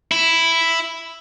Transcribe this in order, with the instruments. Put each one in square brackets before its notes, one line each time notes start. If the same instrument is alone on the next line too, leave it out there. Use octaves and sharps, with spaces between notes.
[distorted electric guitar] E4